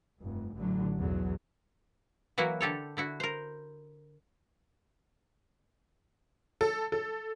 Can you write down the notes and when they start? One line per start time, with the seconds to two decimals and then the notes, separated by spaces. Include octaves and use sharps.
0.19 F1 G2
0.55 A1 D3 F#3
0.96 B1 E2 F#3
2.38 E3 F#3 A#3 E4 F#4
2.61 D3 G4 A4 C#5
2.97 D3 E4 F#4
3.20 A#4 C5
6.61 A4
6.92 A4